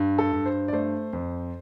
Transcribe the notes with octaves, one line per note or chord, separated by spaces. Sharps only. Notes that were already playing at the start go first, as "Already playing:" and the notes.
Already playing: G2
A4
G2
C5
D5
A3 C5
F2